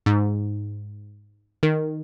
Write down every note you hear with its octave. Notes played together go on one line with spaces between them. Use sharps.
G#2
D#3